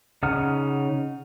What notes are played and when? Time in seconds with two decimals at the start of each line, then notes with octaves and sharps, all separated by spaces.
0.23 C#3 D#4 F#5 D#6 F6